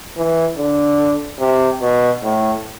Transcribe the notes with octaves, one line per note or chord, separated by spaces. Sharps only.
E3
D3
C3
B2
A2